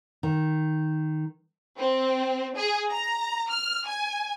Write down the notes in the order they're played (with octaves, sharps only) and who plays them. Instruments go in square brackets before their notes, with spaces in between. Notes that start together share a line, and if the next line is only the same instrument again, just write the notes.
[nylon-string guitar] D#3
[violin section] C4
G#4
A#5
F6
G#5